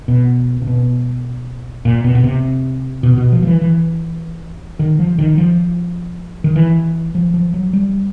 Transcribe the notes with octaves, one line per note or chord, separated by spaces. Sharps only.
B2
C3
B2
A#2
B2
B2
C3
B2
B2
F3
F3
E3
E3
D#3
F3
D#3
F3
D#3
E3
F3
F3
F#3
G3